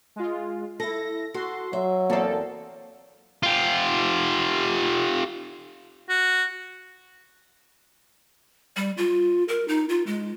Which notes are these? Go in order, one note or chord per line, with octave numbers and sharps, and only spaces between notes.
G#3 F4
E4 A4 A#6
F#4 A4 C6
F#3 E5
E2 A#3 C4 A4
F4 G4
F#4
G3
F4
A#4
D#4
F4
G#3